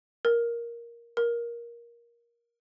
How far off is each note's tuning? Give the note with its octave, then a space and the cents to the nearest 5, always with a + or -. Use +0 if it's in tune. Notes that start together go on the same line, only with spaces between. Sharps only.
A#4 +10
A#4 +15